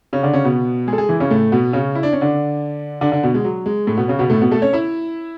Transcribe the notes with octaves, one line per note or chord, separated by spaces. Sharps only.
C#3 C#4
D3 D4
C#3 C#4
B2 B3
G#3 G#4
A4
G#3 G#4
E3 E4
C#3 C#4
A2 A3
B2 B3
C#3 C#4
E4
D4
C#4
D3 D4
D3 D4
D3 D4
B2 B3
G#3
F#3
G#3
A2 A3
B2 B3
C#3 C#4
B2 B3
A2 A3
B2 B3
A3 A4
C#4 C#5
E4 E5